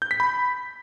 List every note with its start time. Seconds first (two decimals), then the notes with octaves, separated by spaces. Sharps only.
0.02 G6
0.11 B6
0.20 B5